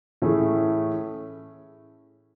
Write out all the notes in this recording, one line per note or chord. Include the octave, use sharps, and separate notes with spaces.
A2 E3 A3 C#4 G#4